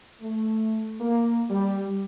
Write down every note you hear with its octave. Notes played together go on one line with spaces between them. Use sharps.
A3
A#3
G3